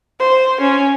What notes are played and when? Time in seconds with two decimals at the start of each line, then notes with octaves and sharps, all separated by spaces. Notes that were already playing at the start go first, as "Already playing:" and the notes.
0.20 C5
0.61 C#4